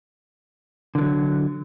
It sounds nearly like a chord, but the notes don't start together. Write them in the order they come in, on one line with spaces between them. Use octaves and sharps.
D3 E3 F#3